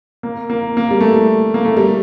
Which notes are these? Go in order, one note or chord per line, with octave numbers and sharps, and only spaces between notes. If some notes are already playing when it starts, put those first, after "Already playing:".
A#3
A#3
A#3
G3
A3
A#3
A3
G3